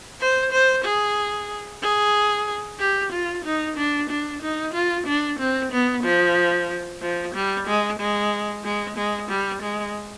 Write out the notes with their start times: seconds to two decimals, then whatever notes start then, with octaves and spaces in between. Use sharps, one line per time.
0.20 C5
0.52 C5
0.84 G#4
1.82 G#4
2.80 G4
3.12 F4
3.45 D#4
3.77 D4
4.10 D4
4.42 D#4
4.74 F4
5.06 D4
5.39 C4
5.72 B3
6.04 F3
7.02 F3
7.35 G3
7.67 G#3
7.99 G#3
8.64 G#3
8.96 G#3
9.29 G3
9.62 G#3